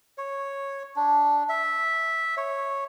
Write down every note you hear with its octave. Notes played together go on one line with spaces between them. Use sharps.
C#5
D4
E5
C#5